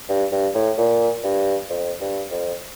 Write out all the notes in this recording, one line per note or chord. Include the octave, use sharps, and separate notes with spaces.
G2
G2
A2
A#2
G2
F2
G2
F2